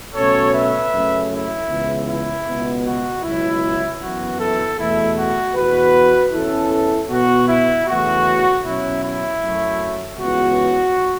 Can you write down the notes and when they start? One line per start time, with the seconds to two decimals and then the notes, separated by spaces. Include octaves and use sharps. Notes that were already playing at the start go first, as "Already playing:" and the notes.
0.14 B2 F#3 A3 C#4 A4 C#5
0.53 B4 E5
0.92 F#2 C#3 A3 C#4
1.31 E4
1.69 C#2 C#3 E3 B3
2.08 E4
2.46 C#2 B2 B3
2.85 F#4
3.23 C#2 B2 F#3 E4
4.01 F#2 E3 B3 F#4
4.39 E4 A4
4.78 E2 B2 A3 E4
5.16 F#4
5.55 E2 B2 B3 F#4 B4
6.32 E2 E3 C#4 E4 A4
7.10 B2 B3 F#4
7.48 E4
7.87 E2 C#3 E3 A3 F#4
8.64 B2 F#3 C#4 E4
9.03 E4
9.41 F#2 F#3 A3
10.18 C#2 C#3 E3 B3 F#4